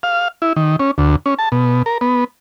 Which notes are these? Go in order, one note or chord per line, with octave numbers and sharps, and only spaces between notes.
F5
E4
D#3
C#4
D2
C#4
A5
B2
A#4
B3